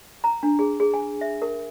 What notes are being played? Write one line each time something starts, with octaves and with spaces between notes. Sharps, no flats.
A#5
D4
G#4
G#4
G#5
E5
A#4